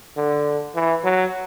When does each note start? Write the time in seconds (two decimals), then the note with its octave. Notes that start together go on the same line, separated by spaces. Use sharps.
0.16 D3
0.75 E3
1.04 F#3